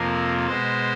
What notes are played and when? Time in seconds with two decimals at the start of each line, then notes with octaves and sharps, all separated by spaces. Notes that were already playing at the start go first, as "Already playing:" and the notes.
Already playing: F2 C3 F3 A#3 A#4
0.47 B2 G#3 C5